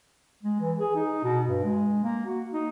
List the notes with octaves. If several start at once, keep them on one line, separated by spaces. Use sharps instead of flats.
G#3
E3
G#4
D#4
B2
G2
G#3
A#3
F#4
D#4